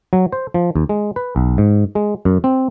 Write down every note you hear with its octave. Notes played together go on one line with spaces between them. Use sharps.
F#3
C5
F3
D#2
G#3
B4
B1
G#2
G#3
F#2
C4